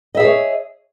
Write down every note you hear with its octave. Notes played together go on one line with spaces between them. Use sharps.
G#4 A4 C#5 D#5 E5